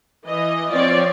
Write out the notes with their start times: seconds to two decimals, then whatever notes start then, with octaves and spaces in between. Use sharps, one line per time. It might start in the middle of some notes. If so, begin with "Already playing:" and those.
0.25 E3 D#5
0.72 F3 C4 C#5 D5